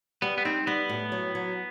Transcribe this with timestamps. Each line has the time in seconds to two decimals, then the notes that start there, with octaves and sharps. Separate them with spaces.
0.22 G3 B3
0.38 B3
0.45 C4 D#4
0.67 G3 B3
0.89 A2
1.12 F#3
1.35 F#3